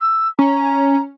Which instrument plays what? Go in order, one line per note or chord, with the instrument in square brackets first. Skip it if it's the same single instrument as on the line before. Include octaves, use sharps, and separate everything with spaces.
[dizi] E6
[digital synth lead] C#4 [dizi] A#5